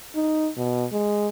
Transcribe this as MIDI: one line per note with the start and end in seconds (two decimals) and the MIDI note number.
0.15 0.50 63
0.57 0.85 47
0.92 1.28 56